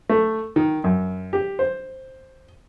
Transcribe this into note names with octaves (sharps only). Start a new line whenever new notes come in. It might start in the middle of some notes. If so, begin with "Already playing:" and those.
A3
D#3
F#2
G4
C5